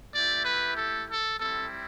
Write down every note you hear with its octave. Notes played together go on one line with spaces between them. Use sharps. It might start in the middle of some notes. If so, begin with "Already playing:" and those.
A3 E4 G4 D5
B4
A4
A4
G3 C4 E4 A4